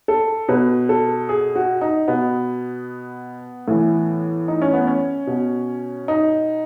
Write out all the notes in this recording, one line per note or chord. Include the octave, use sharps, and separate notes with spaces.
A4
B2 B4
A4
G#4
F#4
D#4
B2 B3
A2 E3
D#4
C#4
B3
C#4
B2
D#4